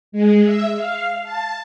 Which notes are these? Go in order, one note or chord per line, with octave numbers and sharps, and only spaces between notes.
G#3
E5
F5
A5